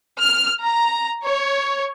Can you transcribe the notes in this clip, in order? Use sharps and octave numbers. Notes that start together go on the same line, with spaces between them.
F6
A#5
C#5